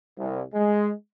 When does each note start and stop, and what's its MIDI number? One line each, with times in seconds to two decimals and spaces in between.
0.19 0.43 36
0.54 0.91 56